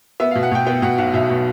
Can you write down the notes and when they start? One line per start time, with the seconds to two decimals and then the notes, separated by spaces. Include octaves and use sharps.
0.20 B3 E5
0.31 F5
0.35 B2
0.43 F#5
0.52 B2 G5
0.67 B3 G5
0.82 B2 F#5
0.98 B1 F#5
1.13 B1 E5
1.29 B2